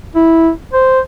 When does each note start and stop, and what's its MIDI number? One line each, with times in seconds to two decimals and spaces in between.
0.15 0.50 64
0.73 1.00 72